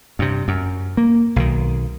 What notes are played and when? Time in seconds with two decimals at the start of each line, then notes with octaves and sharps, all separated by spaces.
0.19 G2 C3
0.48 F#2
0.97 A#3
1.36 B1 D#3